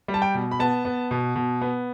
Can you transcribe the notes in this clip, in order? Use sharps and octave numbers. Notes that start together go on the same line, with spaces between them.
G3
A5
G5
B2
B5
B3 A5
B3
B2
B2
B3